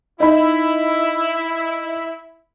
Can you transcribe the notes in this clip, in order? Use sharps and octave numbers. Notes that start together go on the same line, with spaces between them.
D#4 E4 B5